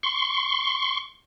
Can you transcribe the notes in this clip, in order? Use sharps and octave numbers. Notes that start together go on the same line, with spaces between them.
C6 C#6